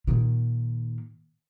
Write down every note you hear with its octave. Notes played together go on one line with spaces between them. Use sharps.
A#2 D#3